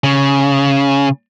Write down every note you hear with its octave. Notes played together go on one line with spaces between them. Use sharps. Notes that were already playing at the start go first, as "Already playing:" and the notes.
C#3